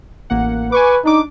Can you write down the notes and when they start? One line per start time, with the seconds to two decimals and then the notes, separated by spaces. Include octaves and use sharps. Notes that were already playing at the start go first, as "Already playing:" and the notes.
0.30 A1 A#3 F#5
0.72 B4 G#5 C#6 D6
1.05 D4 D#4 D6